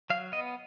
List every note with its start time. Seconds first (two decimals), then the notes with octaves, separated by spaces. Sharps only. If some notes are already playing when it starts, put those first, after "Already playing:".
0.10 F#3 F5
0.32 B3 D#5